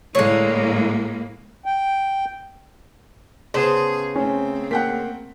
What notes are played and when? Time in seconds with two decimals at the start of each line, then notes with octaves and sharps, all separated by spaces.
0.15 A2 D3 G#3 A#3 C#5
1.66 G5
3.54 C#3 B3 G#4 C5 A5
4.15 A3 C4 C#4
4.71 A#3 F#5 G5 B6